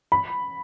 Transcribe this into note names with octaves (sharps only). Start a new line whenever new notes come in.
B5